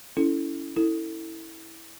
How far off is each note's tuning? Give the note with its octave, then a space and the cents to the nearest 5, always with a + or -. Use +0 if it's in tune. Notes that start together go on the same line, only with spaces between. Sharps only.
C#4 +25 E4 +0 A4 +0
E4 -15 A4 +25